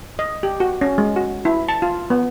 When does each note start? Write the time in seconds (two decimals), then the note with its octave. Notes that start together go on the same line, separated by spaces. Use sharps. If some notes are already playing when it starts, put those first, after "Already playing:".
0.19 D#5
0.43 G4
0.60 F#4
0.81 C#4
0.98 G#3
1.16 F#4
1.45 E4
1.69 A5
1.82 F4
2.10 B3